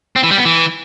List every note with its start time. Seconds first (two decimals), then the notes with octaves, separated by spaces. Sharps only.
0.16 C4
0.23 E3
0.31 G3
0.38 B3
0.45 E3